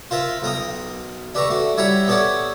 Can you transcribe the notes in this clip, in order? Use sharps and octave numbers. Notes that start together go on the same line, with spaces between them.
F4 A#4 C5 E5
B1 A#4 G5 D#6
D4 G4 B4 E5 A#5 C#6
A3 D4 F#4
G3 E4 C#5 F#5 A#5 B5
B3 G4 A4 C#5 D5 F#5